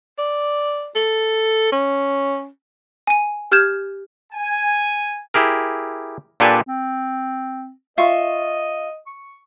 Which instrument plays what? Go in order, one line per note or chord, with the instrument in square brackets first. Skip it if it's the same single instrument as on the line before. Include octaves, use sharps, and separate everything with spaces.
[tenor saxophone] D5
A4
C#4
[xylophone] G#5 D#7
G4 F6 G6 G#6 E7
[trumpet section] G#5
[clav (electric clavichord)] E4 G4 G#4 A#4
A#2 D4 G4 A4 B4 G#5
[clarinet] C4
[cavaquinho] F4 E5 C#6 [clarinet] D#5
[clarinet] C#6